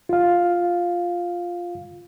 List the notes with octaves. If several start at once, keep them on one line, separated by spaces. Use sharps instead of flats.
F4 F5